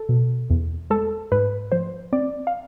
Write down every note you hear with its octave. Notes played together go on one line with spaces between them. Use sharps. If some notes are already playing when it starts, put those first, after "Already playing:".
Already playing: A4
B2
E2
G#3 A4
G#2 B4
F3 C5
C4 D5
F5